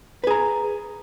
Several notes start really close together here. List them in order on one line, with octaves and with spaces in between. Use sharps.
B4 G#4 A#5